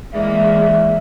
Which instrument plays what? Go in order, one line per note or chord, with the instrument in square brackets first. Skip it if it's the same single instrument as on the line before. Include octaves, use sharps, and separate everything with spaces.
[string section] E3 G#3 A#3 [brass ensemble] D5 E5